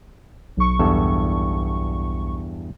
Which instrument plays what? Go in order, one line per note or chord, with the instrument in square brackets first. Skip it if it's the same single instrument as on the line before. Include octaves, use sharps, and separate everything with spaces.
[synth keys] B1 C#6
[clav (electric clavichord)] E2 G2 A4